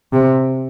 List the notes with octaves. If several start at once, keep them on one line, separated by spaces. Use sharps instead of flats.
C3